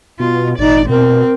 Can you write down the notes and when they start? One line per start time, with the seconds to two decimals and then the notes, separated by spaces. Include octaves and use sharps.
0.20 B2 F4
0.59 G#1 A#2 D#4 D5
0.89 B2 C4 A#4